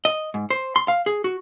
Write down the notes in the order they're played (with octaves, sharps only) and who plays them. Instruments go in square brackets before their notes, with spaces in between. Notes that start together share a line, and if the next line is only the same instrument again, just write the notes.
[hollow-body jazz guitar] D#5
G#2
C5
C6
F5
G#4
F#4